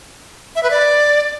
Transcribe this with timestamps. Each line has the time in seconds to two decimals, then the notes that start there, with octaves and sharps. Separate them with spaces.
0.56 E5
0.63 B4
0.71 D5